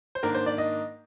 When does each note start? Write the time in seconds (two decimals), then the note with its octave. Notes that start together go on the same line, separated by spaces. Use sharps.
0.15 C5
0.23 G#2 D#3 A#3 D4 A#4
0.35 C5
0.46 D5
0.58 D#5